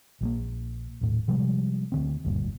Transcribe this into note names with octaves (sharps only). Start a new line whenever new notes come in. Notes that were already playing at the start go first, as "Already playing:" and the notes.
A#1 G3 A#3
D#1 A2
C3 F3 G3 G#3
D2 D3 C4
F#1 D2 G2 A#2